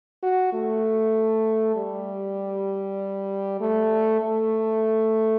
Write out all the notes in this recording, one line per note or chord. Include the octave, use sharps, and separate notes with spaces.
F#4
A3
G3
A3
A3